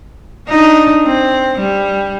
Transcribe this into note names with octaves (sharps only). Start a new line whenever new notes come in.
D4 D#4
C4
G3